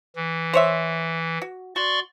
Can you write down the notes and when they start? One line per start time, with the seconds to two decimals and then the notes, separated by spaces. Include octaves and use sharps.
0.16 E3
0.53 C5 C#5 E5
1.42 F#4
1.76 F#4 D5 C6 C#6